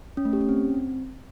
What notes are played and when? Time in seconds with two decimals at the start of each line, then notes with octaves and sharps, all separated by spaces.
0.17 C#4
0.25 A3
0.33 G4
0.41 C#4
0.49 C4